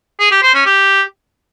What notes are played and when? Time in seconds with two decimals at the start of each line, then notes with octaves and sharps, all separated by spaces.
0.19 G#4
0.31 G4
0.42 C5
0.54 C#4
0.66 G4